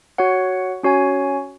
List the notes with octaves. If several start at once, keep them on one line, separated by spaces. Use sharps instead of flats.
F#4 C#5 F#5
C#4 F#4 C#5 G#5